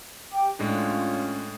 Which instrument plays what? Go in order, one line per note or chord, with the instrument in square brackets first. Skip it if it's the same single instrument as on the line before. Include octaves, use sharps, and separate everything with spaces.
[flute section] G4 G5 D6
[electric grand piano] A2 G#3 D4 [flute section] C#4 F4